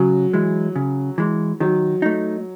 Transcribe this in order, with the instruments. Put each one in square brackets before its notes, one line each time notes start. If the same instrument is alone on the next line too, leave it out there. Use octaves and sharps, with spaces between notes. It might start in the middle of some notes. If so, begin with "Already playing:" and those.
Already playing: [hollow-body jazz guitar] C#3 [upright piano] F#3
[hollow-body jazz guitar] E3 G#3
C#3
E3 G#3
[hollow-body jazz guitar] D#3 [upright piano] F#3
[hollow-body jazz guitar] A3 D#4